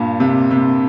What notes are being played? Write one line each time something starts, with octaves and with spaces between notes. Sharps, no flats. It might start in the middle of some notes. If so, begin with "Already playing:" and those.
Already playing: G2 A#2
C3
C3